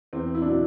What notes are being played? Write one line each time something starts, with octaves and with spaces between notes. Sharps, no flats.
E2 C4
E4
D4
B2 F#3 E4